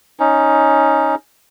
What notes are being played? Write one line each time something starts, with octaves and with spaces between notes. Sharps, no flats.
C#4 D#4